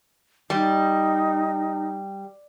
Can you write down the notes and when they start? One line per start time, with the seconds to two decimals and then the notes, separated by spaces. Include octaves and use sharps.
0.50 G3 D#4